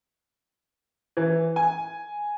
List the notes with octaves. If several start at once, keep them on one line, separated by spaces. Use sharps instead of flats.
E3
G#5